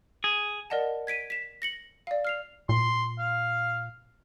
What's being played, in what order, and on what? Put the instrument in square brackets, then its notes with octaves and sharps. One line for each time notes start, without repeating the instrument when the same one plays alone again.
[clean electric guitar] G#4
[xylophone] A#4 D5 D#5 F#5 A5
G#6 B6 D7 D#7
B6 E7
A#6 C#7 F#7
D5 F5
F6 C7 F7
[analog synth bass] A#2 [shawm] C6
[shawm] F5